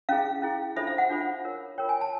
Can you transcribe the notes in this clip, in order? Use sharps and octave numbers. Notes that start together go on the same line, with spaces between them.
C#4 E4 G#4 F5
C#4 E4 G#4
D4 F4 A4 C5 E5
F5
F#5
D4 F4 A4 C5
F4 A#4 C#5
F4 A#4 C#5 G5
G#5
A5